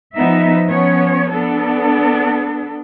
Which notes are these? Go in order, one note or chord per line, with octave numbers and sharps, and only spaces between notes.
F3 B3 D#4 E5
F3 B3 C#4 C#5
B3 D4 A4